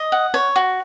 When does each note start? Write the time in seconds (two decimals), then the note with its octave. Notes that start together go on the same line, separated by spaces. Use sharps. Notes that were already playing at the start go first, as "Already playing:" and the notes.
Already playing: D#5
0.12 F#5
0.34 C#5
0.56 F#4